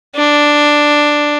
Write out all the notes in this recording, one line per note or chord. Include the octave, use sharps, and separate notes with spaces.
D4